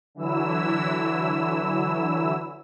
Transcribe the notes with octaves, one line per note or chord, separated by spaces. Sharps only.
D3 E3 F#3 E4 E6